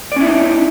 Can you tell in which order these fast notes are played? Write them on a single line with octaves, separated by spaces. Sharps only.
D5 C#4 E4 D#4